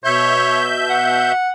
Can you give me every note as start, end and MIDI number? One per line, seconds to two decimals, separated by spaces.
0.04 1.32 47
0.04 0.65 73
0.04 1.32 76
0.04 1.32 91
0.90 1.51 78